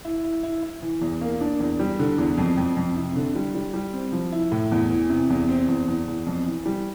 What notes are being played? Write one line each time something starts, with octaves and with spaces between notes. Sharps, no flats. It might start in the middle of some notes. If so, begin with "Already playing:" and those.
E4
E4
E4
E4
E3
E2
A#3
D4
E2
G3
D3
E2
F2
F2
F2
C3
D3
G3
G3
G3
C4
F3
E4
A2
E2
E3
C3
E2
C4
E2
E2
E2
F2
E3
G3